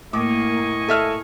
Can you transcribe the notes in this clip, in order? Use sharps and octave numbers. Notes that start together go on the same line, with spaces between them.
A2 A#3 D#5 G#5 C#6 D6
A4 E5 F6